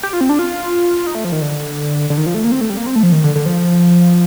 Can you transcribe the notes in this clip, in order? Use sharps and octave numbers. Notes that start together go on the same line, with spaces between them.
G4
F4
C4
D4
F4
D#4
A3
F3
D#3
D3
D3
D#3
F3
A3
A#3
C4
A3
G3
A#3
C4
A3
F3
D#3
D3
D3
F3